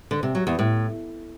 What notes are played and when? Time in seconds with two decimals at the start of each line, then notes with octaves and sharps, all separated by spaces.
0.11 D3
0.23 C3
0.35 F#3
0.47 E2
0.59 A2